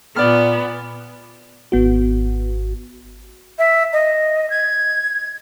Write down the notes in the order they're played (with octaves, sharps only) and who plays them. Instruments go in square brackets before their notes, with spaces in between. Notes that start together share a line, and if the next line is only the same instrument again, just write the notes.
[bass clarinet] A#2 [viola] B3 [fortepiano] D5 F6
[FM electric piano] G#1 B3 F#4
[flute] E5
D#5
G#6